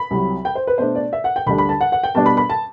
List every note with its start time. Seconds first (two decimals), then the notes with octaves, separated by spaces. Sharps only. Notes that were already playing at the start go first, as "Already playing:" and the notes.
Already playing: B5
0.11 C2 C3 F#3
0.45 G5
0.55 C5
0.67 B4
0.78 B2 A3 D4 C5
0.95 D5
1.13 E5
1.24 F#5
1.36 G5
1.46 D2 D3 G3 D4 B5
1.58 B5
1.69 A5
1.81 F#5
1.92 F#5
2.03 G5
2.15 B2 G3 D4 A5
2.26 B5
2.37 B5
2.50 A5